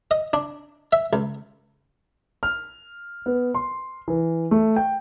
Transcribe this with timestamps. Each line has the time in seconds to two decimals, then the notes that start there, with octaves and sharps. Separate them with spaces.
0.11 D#5
0.33 D4
0.93 E5
1.13 C#2
2.43 F6
3.26 B3
3.55 C6
4.08 E3
4.51 A3
4.76 G5